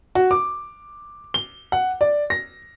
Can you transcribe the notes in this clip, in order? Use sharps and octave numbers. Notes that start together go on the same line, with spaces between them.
F#4
D6
G7
F#5
D5
A#6